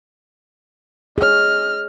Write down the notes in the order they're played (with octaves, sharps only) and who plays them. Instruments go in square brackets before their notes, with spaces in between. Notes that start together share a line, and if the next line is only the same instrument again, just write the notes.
[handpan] G#4 C#5 [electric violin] D#5 F6